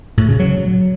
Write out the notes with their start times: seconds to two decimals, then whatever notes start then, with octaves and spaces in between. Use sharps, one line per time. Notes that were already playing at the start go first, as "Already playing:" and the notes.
0.17 A2
0.28 C#3
0.40 F#3